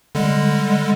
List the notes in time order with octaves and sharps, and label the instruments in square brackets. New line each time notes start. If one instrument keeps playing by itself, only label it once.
[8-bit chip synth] D3 G3 G#3